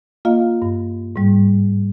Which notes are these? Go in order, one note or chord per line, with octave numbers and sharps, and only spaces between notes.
A#3 F4 D#5 F5
G2
G#2 G3